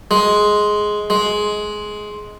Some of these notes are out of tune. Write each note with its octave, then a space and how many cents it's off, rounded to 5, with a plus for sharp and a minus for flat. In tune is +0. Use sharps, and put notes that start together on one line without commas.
G#3 +10
G#3 +15